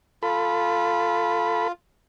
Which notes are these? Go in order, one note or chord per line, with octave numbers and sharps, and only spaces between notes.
F4 A4 B5